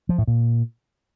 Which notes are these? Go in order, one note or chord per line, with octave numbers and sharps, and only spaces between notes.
F3
A2
A#2